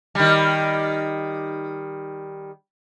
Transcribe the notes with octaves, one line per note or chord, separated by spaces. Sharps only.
D#3 G3